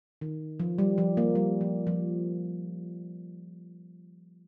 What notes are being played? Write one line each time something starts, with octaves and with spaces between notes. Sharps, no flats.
D#3
F3
G3
F3
A#3
G3
F3
F3